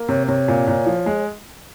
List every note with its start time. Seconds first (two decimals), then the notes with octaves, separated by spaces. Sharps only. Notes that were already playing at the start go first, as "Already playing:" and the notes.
Already playing: A#3
0.09 C3 C#5
0.28 C3 C#5
0.48 A#2
0.68 A#2
0.86 F3
1.06 G#3